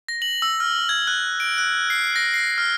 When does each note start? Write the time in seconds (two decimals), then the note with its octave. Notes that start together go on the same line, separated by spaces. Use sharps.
0.08 A#6
0.22 F#7
0.42 E6
0.60 F6
0.89 G#6
1.07 F#6
1.40 D7
1.58 F#6
1.90 C7
2.16 A#6
2.34 C7
2.58 F6